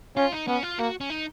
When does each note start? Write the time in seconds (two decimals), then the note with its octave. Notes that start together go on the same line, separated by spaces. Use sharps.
0.17 C#4 F4
0.32 D#4
0.48 B3 C#4
0.63 F4
0.79 A#3 F#4
1.01 C#4
1.10 D#4